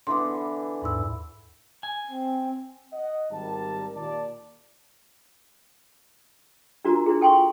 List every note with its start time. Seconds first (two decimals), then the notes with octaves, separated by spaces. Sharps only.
0.07 D3 E3 B3 C6 D6
0.82 D#2 G#2 E6
1.83 G#5
2.05 C4
2.92 D#5 F#5
3.30 G#1 G3 A#4 A5
3.95 D#2 A#2 D5 A5
6.84 D4 F4 F#4 A#4 A#5
7.06 D4 E4 F#4 G#4
7.21 A4 G5 G#5 C6 C#6
7.38 F4